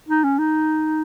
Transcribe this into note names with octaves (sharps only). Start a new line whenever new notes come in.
D#4
C#4
D#4